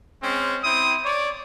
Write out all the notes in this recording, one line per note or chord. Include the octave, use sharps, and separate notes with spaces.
G#3 C4 C#4
C4 E4 D#6
C#5 D5